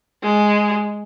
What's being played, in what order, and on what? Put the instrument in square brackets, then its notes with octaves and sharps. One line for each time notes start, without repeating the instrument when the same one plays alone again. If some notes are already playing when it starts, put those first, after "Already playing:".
[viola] G#3